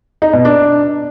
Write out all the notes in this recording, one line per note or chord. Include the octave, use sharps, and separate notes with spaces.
D#4
B2
D4